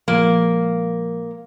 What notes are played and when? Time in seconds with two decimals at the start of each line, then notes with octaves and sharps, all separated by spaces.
0.08 A#2 F3 G#3 A#3